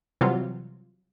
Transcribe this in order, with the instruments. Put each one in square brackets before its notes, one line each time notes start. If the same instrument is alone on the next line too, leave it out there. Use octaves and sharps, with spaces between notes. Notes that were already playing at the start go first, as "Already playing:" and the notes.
[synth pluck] C3 E3 F#3 G3 F4